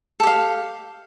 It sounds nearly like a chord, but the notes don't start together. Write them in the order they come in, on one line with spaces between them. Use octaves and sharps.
A4 G4 F5